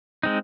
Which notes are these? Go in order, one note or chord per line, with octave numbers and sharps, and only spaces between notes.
G#3 C4 D#4